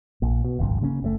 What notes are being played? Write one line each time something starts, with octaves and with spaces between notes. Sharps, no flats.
A#1 A#2
B2
D#1 G#1 C#2 F#2
C#3 A#3 B3 C#4
F#1 A#2 A3